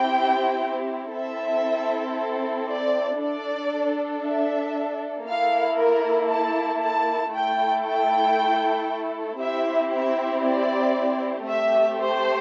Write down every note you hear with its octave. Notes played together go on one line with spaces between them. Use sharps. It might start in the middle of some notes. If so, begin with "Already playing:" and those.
Already playing: C4 E4 G4 G5
C4 E4 A4 E5
D5
D4 A4 D5
E5
A#3 E4 A4 F5
A#4
A5
A5
A3 E4 A4 G5
G5
C4 E4 G4 E5
E5
D5
A3 C4 G4 E5
C5